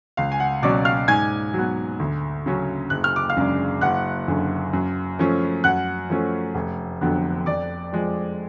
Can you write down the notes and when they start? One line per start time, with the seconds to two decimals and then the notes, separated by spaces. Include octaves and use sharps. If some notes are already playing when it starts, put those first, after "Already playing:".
0.17 C#2 F5
0.32 G#5
0.40 F#5
0.62 B2 F#3 C#4 D5 D6
0.85 F5 F6
1.08 G#2 G#5 G#6
1.54 F#3
1.59 B3
1.99 D2
2.46 C#3 F#3 C#4
2.90 F#1 F#6
3.04 F6
3.16 D6
3.30 F5 F6
3.37 F#2 C#3 G#3 D4
3.81 F#1 F#5 F#6
4.28 F#2 D3
4.73 F#2
5.19 F3 A3 C#4
5.64 F#2 F#5 F#6
6.10 F3 A3 C#4
6.55 F1
7.01 F2 D3 F#3 B3
7.46 F2 D5 D6
7.93 F3 G#3